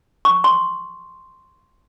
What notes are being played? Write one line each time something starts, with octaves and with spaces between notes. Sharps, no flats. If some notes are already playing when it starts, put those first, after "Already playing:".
C#6
C6